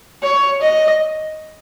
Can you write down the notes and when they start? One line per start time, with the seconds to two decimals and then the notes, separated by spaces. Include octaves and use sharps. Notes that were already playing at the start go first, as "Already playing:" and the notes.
0.22 C#5
0.62 D#5